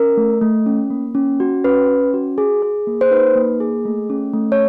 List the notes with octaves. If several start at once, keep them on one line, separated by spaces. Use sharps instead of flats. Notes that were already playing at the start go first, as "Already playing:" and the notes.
Already playing: C#4 A#4
A3
A3
C#4
A#3
C#4
F#4
C#4 B4
C#4
F#4
G#4
G#4
A#3
C5
D#4 B4
A#3
G#4
A3
C#4
A3
C#5